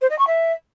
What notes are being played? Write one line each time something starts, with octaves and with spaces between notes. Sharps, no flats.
C5
D#5
C#6
E5